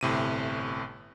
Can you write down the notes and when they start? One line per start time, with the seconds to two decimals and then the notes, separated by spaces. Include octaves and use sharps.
0.01 G1 A2 C3 D#7